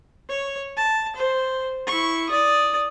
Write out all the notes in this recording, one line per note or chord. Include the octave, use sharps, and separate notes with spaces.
C#5
A5
C5
E4 C#6
D5 D#6